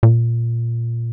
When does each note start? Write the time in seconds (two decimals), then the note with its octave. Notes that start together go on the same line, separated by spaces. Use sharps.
0.03 A#2